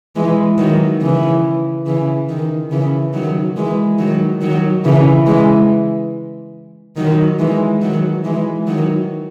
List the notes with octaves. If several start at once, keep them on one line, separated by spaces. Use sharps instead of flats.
E3 G#3
D#3 F#3
C#3 E3
C#3 E3
D#3
C#3 E3
D#3 F#3
E3 G#3
D#3 F#3
D#3 F#3
C#3 E3
E3 G#3
D#3 F#3
E3 G#3
D#3 F#3
E3 G#3
D#3 F#3